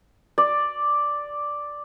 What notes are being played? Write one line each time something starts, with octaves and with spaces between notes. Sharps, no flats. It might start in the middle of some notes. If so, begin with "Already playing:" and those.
D5